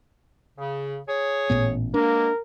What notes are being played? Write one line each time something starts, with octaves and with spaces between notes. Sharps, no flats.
C#3
G#4 C#5
A1 A#2 B3
B2 G#3 A#3 D4 A#4